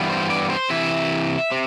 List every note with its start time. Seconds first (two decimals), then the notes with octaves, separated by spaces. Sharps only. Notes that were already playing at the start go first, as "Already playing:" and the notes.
Already playing: G2 E3 G3 B3
0.10 C5
0.30 D5
0.50 C5
0.70 C3 E3 E5
1.52 C3